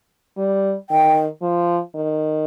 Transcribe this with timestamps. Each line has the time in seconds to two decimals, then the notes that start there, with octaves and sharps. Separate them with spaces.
0.37 G3
0.90 D#3 G5
1.42 F3
1.95 D#3